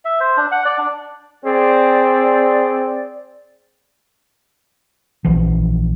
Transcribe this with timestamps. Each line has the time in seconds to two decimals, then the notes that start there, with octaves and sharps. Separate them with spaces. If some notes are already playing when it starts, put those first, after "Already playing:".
0.05 E5
0.20 C5
0.37 D4
0.52 F#5
0.65 D5
0.78 D4
1.45 C4 G#4 D5
5.25 A#1 E3 F3